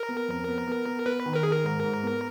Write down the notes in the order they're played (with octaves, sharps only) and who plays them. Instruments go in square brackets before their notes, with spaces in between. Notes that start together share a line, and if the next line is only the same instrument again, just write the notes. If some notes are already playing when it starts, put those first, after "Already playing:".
Already playing: [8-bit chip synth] A#4
[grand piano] B3
F2
B3
B3
B3
[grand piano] B3 [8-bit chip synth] B4
[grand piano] D#3
[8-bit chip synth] A#4
[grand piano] D#3 [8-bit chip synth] G#4
[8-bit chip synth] A#4
[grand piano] G#2
G#2
B3